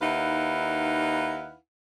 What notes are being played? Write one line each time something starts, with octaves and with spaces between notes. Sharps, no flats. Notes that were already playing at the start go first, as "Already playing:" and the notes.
D#2 D#4 E4 B4 F5 F#5